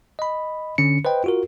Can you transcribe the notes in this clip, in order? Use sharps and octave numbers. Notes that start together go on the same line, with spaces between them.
D#5 B5
D3 C#4 C#7
B4 C5 D#5 G5
F4 F#4 A#4